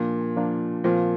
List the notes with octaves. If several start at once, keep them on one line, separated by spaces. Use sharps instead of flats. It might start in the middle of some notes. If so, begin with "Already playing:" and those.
Already playing: A#2 F3 A#3 D4 F4
F3 A#3 D4 F4
A#2 F3 C4 F4